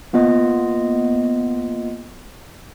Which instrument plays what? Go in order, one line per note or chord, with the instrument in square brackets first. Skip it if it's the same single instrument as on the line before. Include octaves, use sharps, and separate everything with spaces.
[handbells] A#3 B3 F4 D#5